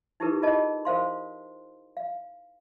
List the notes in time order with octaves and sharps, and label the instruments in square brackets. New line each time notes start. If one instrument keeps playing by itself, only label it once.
[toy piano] D#4 E4 G4 G#4 A#4 B4
F4 G#4 A#4 D#5 A5
A#4 C5 F5 C6
F5